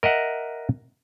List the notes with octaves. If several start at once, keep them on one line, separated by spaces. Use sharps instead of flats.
A#4 D#5 E5 F#5